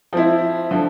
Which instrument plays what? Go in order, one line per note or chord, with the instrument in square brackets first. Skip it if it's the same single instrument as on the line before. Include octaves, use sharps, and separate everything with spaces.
[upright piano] F3 C4 E4
D3 F3